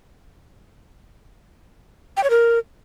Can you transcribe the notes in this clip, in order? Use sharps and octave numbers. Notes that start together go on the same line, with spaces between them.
G5
C#5
A#4